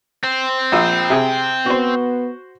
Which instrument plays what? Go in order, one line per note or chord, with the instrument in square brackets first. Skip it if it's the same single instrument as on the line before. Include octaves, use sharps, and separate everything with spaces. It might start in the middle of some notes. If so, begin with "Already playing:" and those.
[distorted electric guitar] C4
[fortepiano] A#1 F4 E6
C3 G#4
[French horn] B3 [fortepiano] F#4 C5